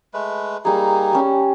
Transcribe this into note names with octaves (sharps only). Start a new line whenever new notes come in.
G#3 A3 B4
G3 A#3 D#4 G#4
G3 C#4